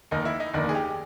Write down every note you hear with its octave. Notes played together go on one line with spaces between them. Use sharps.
F1 D#2 D#3 D#4
E4
D#4
F1 D#2 D#3 D4
G#4
G4